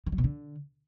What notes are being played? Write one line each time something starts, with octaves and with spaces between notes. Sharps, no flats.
D#3
F#3
B2
D3